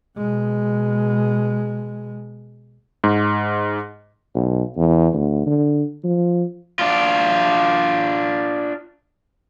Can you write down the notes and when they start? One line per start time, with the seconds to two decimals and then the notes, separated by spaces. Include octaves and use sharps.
0.18 B2 G#3
3.04 G#2
4.35 B1
4.77 E2
5.14 D2
5.46 D3
6.04 F3
6.79 D4 F4